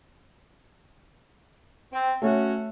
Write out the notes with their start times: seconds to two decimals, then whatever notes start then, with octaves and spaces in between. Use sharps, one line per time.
1.91 C4
2.22 A3 C#4 F#4